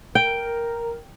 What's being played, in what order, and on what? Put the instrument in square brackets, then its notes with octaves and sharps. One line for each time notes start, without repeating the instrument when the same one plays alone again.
[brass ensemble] A#4 [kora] G5